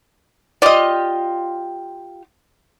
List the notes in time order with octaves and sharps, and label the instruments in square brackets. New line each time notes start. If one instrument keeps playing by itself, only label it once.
[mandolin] F4 G4 [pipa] D5 D#5